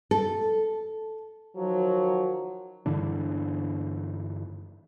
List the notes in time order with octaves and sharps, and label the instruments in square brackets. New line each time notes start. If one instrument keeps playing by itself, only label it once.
[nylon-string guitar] A4
[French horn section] D#3 F3 F#3
[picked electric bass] G2 D3 E3 D4